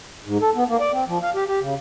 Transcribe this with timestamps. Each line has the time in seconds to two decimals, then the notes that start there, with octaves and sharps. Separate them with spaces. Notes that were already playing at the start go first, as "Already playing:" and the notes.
0.25 G#2
0.41 A4
0.55 B3
0.69 A#3
0.80 D5
0.93 C4
1.07 F3
1.22 F5
1.35 G4
1.47 G4
1.61 C#3